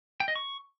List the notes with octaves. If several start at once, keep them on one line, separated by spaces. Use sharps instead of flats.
G5
D#5
C#6